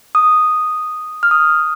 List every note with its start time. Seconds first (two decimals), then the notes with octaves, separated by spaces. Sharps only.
0.15 D#6
1.23 F6
1.31 D#6